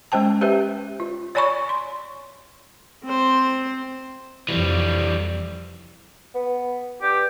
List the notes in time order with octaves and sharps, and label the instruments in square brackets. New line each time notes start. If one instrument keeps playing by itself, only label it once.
[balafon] G#3 C#4 C5 G5 A5
G4 B4 C5 E5
F4
C#5 D5 G#5 B5 C#6
C6
[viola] C4 C5
[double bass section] F2 [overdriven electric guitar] E3 G3
[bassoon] B3
[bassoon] G2 [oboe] G4